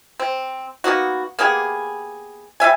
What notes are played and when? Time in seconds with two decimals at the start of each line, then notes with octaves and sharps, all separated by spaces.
0.20 C4
0.84 A#3 B3 D#4 F#4
1.39 A#3 B3 G4 G#4
2.60 G3 D4 E5 G#5